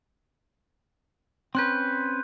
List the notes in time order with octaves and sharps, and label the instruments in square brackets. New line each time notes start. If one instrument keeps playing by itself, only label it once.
[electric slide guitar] C4 C#4 B4 [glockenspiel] C6 F#6 G6